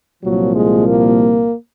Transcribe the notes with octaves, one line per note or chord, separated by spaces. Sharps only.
C2 A#2 F3 F#3
G#3
A#3